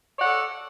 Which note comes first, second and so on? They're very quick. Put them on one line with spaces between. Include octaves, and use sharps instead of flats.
C#5 D5 F#5 A4